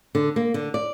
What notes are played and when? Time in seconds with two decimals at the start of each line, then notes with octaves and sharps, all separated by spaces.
0.15 D3
0.36 A#3
0.54 D3
0.74 D5